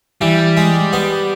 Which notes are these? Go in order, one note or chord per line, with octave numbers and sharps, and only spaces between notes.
E3 G3
G#3
B3